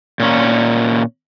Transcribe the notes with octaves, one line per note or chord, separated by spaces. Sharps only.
A#2 C#4